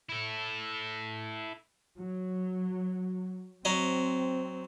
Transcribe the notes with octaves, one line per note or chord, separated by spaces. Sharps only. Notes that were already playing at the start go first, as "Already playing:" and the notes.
E4 A4
F#3
F#3 C4 D#5